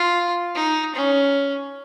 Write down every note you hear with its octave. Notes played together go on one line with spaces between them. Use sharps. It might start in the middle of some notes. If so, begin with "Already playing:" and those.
Already playing: F4
D#4
C#4